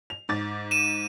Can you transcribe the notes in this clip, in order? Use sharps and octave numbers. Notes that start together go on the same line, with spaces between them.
F7
G#2 D6 A6
D#7 E7